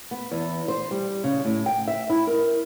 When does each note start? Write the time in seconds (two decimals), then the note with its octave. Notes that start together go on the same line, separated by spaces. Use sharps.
0.11 B3
0.32 E2
0.68 C5
0.91 G3
1.24 C#3
1.45 A2
1.66 G5
1.88 E5
2.10 E4
2.27 A#4